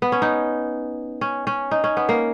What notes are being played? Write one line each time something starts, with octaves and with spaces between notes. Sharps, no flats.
B3
C#4
D#4
C#4
C#4
D#4
C#4
B3
A#3